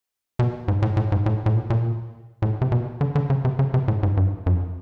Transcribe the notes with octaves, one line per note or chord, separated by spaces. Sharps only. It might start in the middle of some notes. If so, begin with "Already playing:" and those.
B2
G#2
A2
A2
G#2
A2
A2
A#2
A#2
A2
C3
B2
D3
D3
C#3
C3
C#3
C3
A2
G#2
G2
F#2
F2